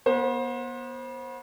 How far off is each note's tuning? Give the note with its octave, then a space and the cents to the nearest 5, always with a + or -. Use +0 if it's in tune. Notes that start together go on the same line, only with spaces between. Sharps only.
B3 -35 C5 +20